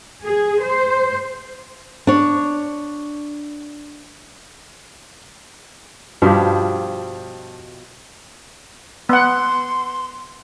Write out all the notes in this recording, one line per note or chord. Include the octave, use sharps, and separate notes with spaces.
G#4
C5
D4 C#5
G2 B2 F3 G4
B3 F#5 C6